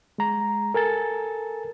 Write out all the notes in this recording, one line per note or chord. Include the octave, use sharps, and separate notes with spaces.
G#3 A#5
A4 A#4 G#5 A6